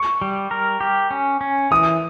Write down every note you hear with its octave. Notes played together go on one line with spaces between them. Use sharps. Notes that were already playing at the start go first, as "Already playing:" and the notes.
Already playing: C#6
G3
A#4
G4
C#4
C#4
E3 D#6